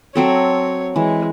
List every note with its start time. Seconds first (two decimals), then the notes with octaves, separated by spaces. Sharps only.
0.15 F#3 C4 A4 C#5
0.96 E3 G#3